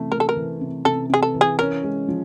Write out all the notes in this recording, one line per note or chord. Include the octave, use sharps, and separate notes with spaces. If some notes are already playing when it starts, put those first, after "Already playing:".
Already playing: C3 E3 A3
A3 A#4
A4
A#4
E3
C3
C3 A4
C3 G#4
A4
E3
G#4
C#4 A#4
G#3
F3